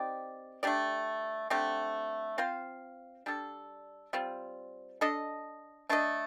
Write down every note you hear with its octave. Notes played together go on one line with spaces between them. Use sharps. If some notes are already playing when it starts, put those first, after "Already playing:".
Already playing: C4 D#4 G4 D5
A3 D4 G4 D5
D3 A3 C4 G4
C4 F4 C5 F5
G3 D4 A4
G3 C4 F4
D4 A4 D#5
A3 D4 A4 D#5